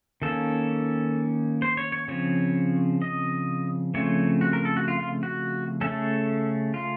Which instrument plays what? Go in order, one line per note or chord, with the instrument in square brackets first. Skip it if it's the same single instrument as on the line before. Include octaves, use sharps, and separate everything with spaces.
[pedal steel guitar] D#3 A#3 C#4 A4
C5
C#5
C#5
C#3 F3 C4 C#5
D#5
C#3 F3 A3 C4 C#5
F#4
A#4
A4
F#4
F4
F4
F#4
C#3 A3 C#4 A4
F4